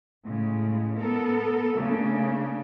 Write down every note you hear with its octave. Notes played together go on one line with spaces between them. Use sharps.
A2 C#3 G#3
B3 A4 A#4
C#3 A3 A#3 D4